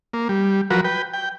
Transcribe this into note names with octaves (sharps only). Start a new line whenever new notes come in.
A#3
G3
F3 F#3 F#4 A#4 B4
B4 G5
G5